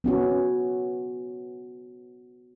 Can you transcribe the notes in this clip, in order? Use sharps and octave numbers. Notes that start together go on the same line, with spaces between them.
B3 C#4 F#4